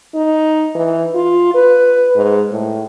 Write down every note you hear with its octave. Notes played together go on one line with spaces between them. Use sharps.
D#4
E3
F4
B4
G#2
A2